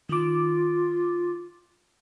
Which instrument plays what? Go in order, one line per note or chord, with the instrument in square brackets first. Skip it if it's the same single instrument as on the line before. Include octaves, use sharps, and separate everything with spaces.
[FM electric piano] D#3 D6 [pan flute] F4